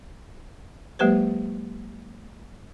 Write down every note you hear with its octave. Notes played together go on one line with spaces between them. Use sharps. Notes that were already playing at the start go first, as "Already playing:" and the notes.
F#3 G#3 A#3 G4 B4 C5